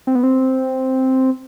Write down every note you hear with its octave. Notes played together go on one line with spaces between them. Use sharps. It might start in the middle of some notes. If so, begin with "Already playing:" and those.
C4
B3
C4